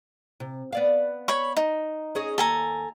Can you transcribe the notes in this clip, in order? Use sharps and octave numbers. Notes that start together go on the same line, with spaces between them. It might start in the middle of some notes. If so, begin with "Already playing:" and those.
C3
B3 D5 F5
C#5 B5 C#6
D#4
C#4 G#4 D#5
D#2 A4 G#5 A#5